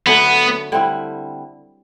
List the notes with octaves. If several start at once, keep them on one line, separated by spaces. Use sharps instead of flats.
D3 F#3 A3 B3 C#4
D3 G3 C4 E4